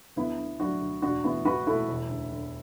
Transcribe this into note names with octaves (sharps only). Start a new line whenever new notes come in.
D2 B3 E4
D3
F#3 D4 F#4
D2
E1 D4 F#4
E2 B3 E4
E3 F#4 B4
E1 E4 A4
E1
D2
D3